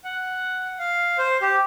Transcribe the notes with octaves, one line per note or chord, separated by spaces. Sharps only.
F#5
F5
C5
G4